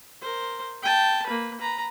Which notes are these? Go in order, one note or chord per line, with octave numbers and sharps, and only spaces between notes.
A#4 C5
G5 A5
A#3 B4
B4 A#5